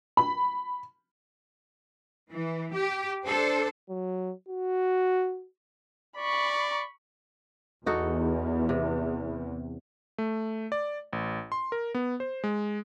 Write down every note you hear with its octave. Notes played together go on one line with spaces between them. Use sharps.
B5
E3
G4
D4 A4 C5
F#3
F#4
D5 B5 C#6
E2 D#4 F#4 A4
C3
A3
D5
A1
C6
A#4
B3
C5
G#3